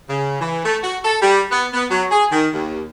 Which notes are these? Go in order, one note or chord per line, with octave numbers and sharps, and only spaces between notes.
C#3
E3
A3
F#4
A4
G3
B3
B3
F#3
G#4
D#3
D#2